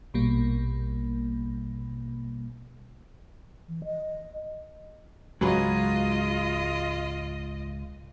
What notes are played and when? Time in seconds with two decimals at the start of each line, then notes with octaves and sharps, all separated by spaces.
0.14 A#1 B2 G3 A#3
3.68 E3
3.85 D#5
5.41 C#2 G#2 F#3 G#3 F4 G#4 B4 D#5